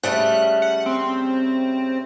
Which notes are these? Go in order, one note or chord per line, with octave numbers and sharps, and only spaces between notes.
C#3 G3 A3 F#6
F#5
C4